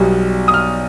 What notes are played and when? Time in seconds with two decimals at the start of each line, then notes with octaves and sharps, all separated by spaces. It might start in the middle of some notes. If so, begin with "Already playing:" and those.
Already playing: B1 B2 G3
0.48 D#6
0.54 F6